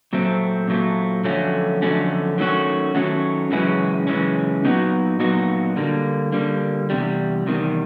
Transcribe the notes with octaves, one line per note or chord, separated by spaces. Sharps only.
A#2 F#3 A3 C4
A#2 F#3 A3 C4
F2 D3 F#3 A3 C#4
F2 D3 F#3 A3 C#4
D#3 F#3 A3 C#4 F#4
D#3 F#3 A3 C#4 F#4
F#2 C#3 E3 G#3 C#4
F#2 C#3 E3 G#3 C#4
A#2 F#3 B3 D#4 F#4
A#2 F#3 B3 D#4 F#4
D3 G3 A#3
D3 G3 A#3
E2 C3 G3
E2 C3 D#3 G3